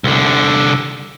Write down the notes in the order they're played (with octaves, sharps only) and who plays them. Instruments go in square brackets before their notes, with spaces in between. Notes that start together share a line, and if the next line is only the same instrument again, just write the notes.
[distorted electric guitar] C2 D3